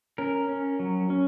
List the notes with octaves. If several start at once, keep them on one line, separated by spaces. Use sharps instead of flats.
C#4 A#4
C#4
F#3
C#4